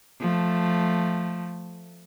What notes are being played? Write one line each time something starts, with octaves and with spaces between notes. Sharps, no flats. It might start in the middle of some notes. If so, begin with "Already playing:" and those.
F3 A3